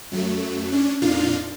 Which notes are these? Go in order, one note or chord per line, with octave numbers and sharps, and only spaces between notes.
F#2 F#3 A3
C#4 D4
F2 A#2 D4 D#4 F4 F5